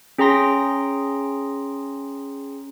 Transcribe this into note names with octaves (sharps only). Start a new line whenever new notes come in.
C#4 G#4 G5 A#5 C6 A#6